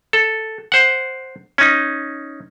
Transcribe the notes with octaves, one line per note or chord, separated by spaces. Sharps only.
A4
C5 F#5
C#4 D#4